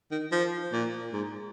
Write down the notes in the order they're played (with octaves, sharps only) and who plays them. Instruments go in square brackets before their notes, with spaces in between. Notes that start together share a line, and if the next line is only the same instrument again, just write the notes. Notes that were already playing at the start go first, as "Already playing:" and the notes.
[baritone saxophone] D#3
F3
A#2
G#2